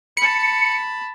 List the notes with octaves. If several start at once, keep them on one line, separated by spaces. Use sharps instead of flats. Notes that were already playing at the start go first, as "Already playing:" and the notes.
A5 B5 C#7